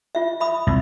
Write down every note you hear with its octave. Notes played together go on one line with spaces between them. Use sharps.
F4 E5
E5 B5 D#6
C2